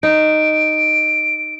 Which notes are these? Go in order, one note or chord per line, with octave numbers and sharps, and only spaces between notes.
D#4 D7